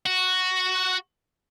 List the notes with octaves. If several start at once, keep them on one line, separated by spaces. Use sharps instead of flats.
F#4